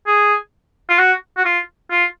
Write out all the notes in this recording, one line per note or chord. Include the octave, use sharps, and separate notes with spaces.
G#4
F4
F#4
F#4
F4
F4